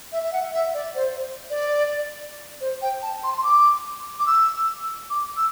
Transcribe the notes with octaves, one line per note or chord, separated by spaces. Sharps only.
E5
E5
F#5
E5
D5
C5
D5
C5
G5
A5
C6
C6
D6
D6
E6
D6
E6